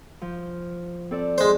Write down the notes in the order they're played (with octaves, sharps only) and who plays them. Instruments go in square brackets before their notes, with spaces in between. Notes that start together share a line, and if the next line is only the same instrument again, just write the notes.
[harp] F3
C4 A4 D5
[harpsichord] G#3 C5